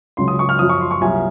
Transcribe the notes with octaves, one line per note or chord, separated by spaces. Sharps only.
C#2 C#3 F#3 C6
D#6
C#6
F6
F#2 F3 D#6
C#6
C6
C#6
C2 A#2 F#3 G#5